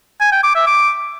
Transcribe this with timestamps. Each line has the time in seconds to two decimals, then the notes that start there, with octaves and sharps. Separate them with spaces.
0.20 G#5
0.32 G5
0.43 D6
0.55 E5
0.67 D6